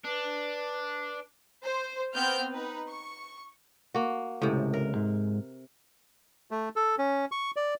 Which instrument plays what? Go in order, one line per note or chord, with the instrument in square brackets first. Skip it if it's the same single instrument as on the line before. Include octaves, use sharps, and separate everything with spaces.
[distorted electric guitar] D4 [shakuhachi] B4
[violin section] C5
B3 C4 G5 F6 G6
D#4 B4
C#6
[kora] A#3 F#4
[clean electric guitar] C#2 [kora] A2 C3
[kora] A#4
[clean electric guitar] G#2
[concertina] A3
A4
C#4
C#6
D5